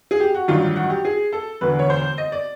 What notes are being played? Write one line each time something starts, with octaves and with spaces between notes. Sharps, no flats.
G#4
G4
F#4
A1 G2 D#3 F#3 F4
F#4
G4
G#4
A4
E1 D2 D3 B4
C#5
C5
D#5
D5